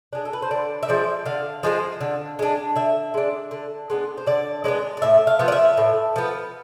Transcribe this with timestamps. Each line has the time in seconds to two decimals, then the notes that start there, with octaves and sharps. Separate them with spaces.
0.13 G#3 D4
0.25 A4
0.33 B4
0.42 C5
0.51 D3 D5
0.83 E5
0.88 F3 G#3 C4 D5
1.26 D3 F5
1.63 F3 G#3 C4
2.01 D3
2.39 G#3 D4
2.76 D3 E5
3.14 G#3 D4
3.51 D3
3.90 G#3 B3 D4
4.17 C5
4.27 D3 D5
4.64 G#3 B3 D4 D5
4.97 D5
5.02 A2 E5
5.27 F5
5.39 F3 B3
5.48 D5
5.52 E5
5.77 A2
6.16 F3 B3